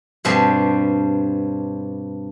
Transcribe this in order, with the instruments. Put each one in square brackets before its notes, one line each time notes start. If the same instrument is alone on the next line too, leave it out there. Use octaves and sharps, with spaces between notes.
[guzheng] G2 B2 G3 C4 D4